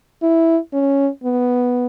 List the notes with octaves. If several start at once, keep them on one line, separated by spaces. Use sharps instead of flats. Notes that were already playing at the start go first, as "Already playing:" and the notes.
E4
C#4
B3